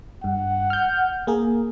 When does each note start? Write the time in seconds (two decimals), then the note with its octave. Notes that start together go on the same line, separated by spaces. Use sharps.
0.24 G2 F#5
0.70 F6 G6
1.27 A#3 G#4 A#4